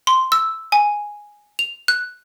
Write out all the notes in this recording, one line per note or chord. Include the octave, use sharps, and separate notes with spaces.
C6
E6
G#5
F7
F#6